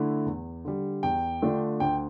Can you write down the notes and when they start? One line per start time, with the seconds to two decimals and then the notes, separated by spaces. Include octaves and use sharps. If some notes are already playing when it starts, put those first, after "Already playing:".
Already playing: D3 A3 E4
0.26 E2
0.65 D3 G3
1.03 E2 G5
1.42 D3 A3 D4 F4
1.80 D2 G5